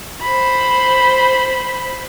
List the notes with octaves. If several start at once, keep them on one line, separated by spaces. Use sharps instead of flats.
C5 B5